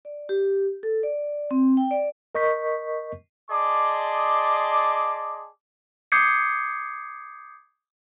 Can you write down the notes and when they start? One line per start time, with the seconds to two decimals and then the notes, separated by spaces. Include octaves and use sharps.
0.05 D5
0.29 G4
0.83 A4
1.03 D5
1.51 C4
1.77 G5
1.91 D5
2.35 A#4 D#5 C#6 G6 B6
3.50 G#4 D5 D#5 A5 C6 D6
6.12 D6 D#6 G6 G#6 C7 C#7